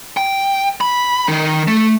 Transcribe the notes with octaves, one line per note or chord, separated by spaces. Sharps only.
G5
B5
D#3 D#4
A3